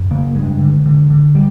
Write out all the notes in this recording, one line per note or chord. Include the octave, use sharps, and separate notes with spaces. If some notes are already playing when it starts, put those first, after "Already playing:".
Already playing: F#2
C#3 A#3
G2 G#3
D3
D3
D3
G3